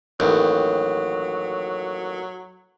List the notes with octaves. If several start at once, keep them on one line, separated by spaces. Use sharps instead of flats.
A1 D#2 F#3